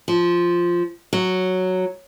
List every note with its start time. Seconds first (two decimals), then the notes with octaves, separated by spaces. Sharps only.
0.08 F3
1.13 F#3